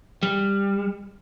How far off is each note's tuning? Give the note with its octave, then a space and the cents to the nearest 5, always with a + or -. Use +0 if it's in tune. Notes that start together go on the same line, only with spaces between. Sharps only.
G3 +15